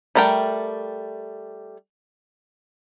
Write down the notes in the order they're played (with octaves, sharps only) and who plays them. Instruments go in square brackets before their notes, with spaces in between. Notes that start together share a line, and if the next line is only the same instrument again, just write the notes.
[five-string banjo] G3 A3 A#4 C#5 G5